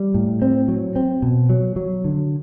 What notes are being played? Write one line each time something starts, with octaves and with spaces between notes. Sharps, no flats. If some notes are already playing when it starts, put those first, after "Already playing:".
Already playing: G3
A2
C4
F#3
C4
B2
F#3
F#3
D3